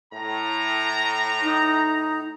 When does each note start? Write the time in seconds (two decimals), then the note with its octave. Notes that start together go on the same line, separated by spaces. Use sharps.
0.13 A2 A#5
1.42 D#4